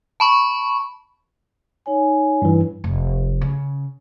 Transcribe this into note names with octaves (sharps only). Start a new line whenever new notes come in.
A5 B5 C#6
D#4 C#5 G#5
G2 E3
F1
C#3